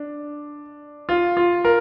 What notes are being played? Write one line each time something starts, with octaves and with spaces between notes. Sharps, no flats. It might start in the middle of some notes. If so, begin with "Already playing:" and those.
Already playing: D4
F4
F4
A#4